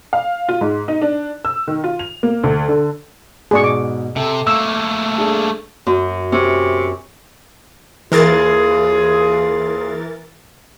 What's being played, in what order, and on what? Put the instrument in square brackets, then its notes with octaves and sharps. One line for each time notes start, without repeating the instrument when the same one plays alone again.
[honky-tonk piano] F5
F4
G#2
D#4
D4
E6
D#3
F4
F7
A#3
D2
D3
[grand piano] G#2 B2 [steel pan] G#4 D5 C#6
[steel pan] D6
[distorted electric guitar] C3 [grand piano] A4
[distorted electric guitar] A3 A#3 [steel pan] E6
[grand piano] D4 G#4 A4
[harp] F#2
[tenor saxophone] C3 [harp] C#4
[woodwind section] D#2 F4 G#4 [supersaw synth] E3 A#4 A6